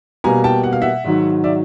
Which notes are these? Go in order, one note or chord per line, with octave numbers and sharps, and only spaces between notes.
B2 G3 A#3 G#5 A#5
G5 A5
F#5
F5
E5 F#5
G#2 D#3 F#3
D5 E5